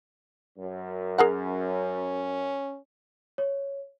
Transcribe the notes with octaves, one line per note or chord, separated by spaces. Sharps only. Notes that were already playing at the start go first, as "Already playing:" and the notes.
F#2
C#4 G#4 A#4 F#5
C#5